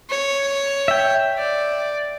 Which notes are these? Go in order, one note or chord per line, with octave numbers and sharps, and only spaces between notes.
C#5
E5 G5
D5